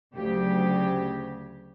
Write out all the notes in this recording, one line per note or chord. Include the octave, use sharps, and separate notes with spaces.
D2 C#3 F#3 G4